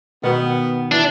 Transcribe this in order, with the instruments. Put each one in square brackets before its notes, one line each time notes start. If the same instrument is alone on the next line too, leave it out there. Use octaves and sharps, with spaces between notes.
[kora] B2 D#3 [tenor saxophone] B3
[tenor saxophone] E3 [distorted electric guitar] D4